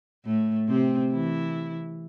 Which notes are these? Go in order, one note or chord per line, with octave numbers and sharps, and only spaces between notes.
A2 A3
C3 C4
E3 E4